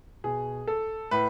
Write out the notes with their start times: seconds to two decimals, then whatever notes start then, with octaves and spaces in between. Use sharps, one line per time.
0.24 B2 G#4
0.67 A4
1.11 A2 B4